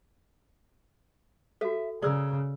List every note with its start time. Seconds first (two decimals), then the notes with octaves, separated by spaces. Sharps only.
1.61 F#4 A4 E5
2.02 C#3 G#4 A#4 D5 E6